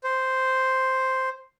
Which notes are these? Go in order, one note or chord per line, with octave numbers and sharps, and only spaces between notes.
C5